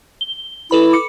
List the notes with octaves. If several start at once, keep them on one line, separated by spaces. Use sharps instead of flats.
G7
E4 A4 B4 B5
D6 C#7